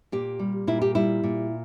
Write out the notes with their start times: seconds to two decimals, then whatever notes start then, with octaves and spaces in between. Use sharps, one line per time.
0.12 A#2 G4
0.39 G3
0.67 A#2 E4
0.82 G4
0.95 G3 E4
1.24 A#2